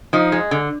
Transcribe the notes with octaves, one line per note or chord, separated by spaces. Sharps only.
F3 D#4
G#3
D3